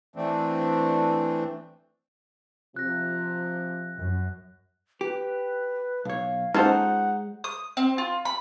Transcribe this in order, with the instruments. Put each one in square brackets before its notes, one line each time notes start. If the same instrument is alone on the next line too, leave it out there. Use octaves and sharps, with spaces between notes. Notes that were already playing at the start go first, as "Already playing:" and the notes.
[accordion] E3 A3 C4 D4
[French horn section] C3 F3 [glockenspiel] F#6 A#6
[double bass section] F#2
[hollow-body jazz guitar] G4 [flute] B4
[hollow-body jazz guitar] B1 C#5 [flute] F5
[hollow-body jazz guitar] G#3 [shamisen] C#4 F4 A4 [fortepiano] D#4 C5 [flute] F#5
[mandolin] D#6
C4
F4
B5